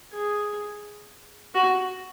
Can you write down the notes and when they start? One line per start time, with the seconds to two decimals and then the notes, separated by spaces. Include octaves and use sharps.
0.13 G#4
1.55 F#4